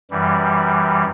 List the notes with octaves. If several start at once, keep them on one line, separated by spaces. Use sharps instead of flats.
F#2 E3 G3